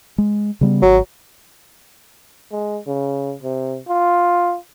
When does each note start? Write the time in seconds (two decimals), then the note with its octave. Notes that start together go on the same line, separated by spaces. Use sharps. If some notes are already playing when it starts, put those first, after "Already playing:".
0.18 G#3
0.61 C#3 G3 B3
0.82 G#1 F#3
2.52 G#3
2.87 C#3
3.43 C3
3.88 F4